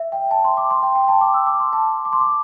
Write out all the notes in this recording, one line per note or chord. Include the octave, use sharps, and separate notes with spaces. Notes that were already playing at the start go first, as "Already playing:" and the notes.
Already playing: E5
G5
A5
C6
D6
C6
G5
G5
A5
D6
E6
D6
C6
A5
D6
C6
D6